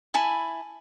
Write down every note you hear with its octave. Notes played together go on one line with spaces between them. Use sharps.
E4 G#5 A5 B5